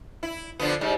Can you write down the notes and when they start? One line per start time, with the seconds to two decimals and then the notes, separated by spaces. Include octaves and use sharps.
0.23 E4
0.60 D3 F3 B3
0.81 G#2 G3